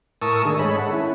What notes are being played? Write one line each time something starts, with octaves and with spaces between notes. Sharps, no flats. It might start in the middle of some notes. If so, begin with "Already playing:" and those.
A2 A#4 A5 C#6 D#6 E6
D#3 A3 D4 G#4
G#2 D#4 G#4 A4 C#5 B5
A4 F#5
C#4 E4